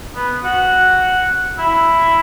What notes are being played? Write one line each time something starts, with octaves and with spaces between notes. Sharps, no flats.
B3
F#4
E4